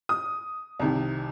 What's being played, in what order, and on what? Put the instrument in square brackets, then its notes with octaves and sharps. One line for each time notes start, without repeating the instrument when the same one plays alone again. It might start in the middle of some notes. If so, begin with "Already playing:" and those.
[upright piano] D#6
C2 C3 D#3